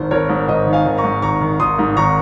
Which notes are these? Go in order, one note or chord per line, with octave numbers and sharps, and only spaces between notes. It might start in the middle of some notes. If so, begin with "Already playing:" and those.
Already playing: G#1 D#3 C5
G#1 A#4 C#5
G#2
G#1 C5 D#5
D#3
F5 G#5
G#1
A#5 C#6
G#2
G#1 A#5 C#6
D#3
G#1 C6 D#6
G#2
G#1 A#5 C#6